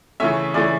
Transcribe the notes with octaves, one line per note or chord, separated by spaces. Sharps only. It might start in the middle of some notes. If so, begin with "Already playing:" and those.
C#3 E3 A3 C#4 E5
C#3 E3 A3 C#4 D5